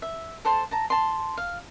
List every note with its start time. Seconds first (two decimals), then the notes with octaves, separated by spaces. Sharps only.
0.02 E5
0.45 A4 C5 A5 C6
0.71 A5 A#5
0.90 A5 C6
1.37 F5